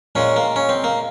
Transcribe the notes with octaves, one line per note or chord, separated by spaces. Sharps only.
A#2 G#3 C#4
A#3
C#4
C4
A#3